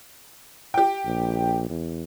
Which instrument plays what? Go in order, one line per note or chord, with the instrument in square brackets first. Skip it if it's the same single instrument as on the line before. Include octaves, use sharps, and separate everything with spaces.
[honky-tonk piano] G4 G5
[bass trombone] A#1
E2